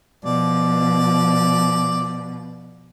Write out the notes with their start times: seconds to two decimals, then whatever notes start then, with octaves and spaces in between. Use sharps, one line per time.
0.25 B2 F3 D5